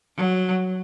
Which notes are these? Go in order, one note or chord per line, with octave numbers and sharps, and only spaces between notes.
F#3